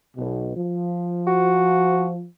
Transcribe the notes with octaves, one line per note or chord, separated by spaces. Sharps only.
B1 B2
F3
F#4